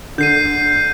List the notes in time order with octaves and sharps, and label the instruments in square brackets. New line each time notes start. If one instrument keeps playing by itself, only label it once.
[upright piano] D3 [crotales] G6 C7 D#7